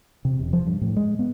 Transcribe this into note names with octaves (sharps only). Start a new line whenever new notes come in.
C3
E1
F3
G2
A2
G#3
B3